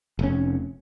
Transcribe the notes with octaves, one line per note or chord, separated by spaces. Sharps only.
F1 C#4